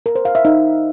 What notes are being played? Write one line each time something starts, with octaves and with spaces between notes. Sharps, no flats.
A#4
C5
F5
E5
D#4